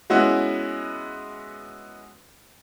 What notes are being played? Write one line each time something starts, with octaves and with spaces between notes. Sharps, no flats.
G#3 B3 C#4 E4 F#4